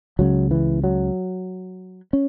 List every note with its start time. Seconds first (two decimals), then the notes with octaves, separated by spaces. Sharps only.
0.19 C#2 C#3 F#3
0.51 E3
0.84 F#3
2.13 C#4